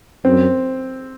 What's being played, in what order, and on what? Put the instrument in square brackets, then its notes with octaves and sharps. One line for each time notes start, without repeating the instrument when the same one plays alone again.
[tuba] F#2 [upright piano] C4